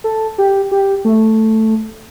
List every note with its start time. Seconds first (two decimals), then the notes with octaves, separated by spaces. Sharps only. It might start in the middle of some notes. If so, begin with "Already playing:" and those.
0.04 A4
0.38 G4
0.71 G4
1.05 A3